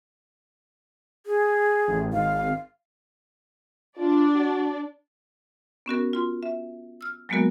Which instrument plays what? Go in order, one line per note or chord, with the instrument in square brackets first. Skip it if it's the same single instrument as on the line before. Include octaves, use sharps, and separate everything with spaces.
[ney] G#4
[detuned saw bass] A1
[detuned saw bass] G#1 [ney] F5
[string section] D4 D5 [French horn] F4
[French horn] F#4
[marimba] B3 C#4 F#4 A#4
F4 C6
E5
E6 F6
F#3 G#3 A#3 B3 F#4 A#4